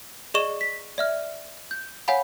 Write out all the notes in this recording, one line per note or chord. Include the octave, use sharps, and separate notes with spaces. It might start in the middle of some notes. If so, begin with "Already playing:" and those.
G#4 D5 D#5 C#6 E7 G7
B6
D5 E5 F6
G6
C#5 F5 F#5 G#5 B5